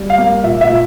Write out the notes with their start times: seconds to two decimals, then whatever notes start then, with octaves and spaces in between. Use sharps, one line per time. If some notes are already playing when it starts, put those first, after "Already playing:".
Already playing: G3
0.10 F5
0.18 A#3
0.44 A#2 E5
0.61 E5
0.69 A#2